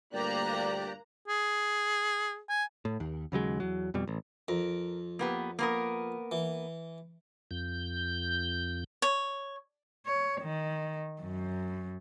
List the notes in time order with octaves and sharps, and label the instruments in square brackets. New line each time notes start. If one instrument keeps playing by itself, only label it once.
[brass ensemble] D2 G2 A#2 [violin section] A#3 A#5 F#6 [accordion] G4 D5
[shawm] G#4
G#5
[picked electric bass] A2
D#2
D#2 C#3 F#3 G#3
E2 F#3
F2 B2 G3
A1
[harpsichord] F2 [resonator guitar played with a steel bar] A#4
[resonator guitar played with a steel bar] A#3 B3 G4
A#3 B3 A#4
[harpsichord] E3
[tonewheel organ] F2 G6
[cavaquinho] C#5
[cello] C#5
D#3
F#2